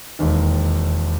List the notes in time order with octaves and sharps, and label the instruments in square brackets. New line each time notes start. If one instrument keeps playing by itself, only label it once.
[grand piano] E1 D#2 D#3